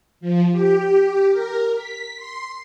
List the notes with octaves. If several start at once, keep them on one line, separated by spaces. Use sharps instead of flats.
F3
G4
A#4
B6
C6